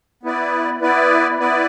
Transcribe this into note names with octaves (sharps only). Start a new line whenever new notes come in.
B3 E4 B4 D5
B3 E4 B4 D5
B3 E4 B4 D5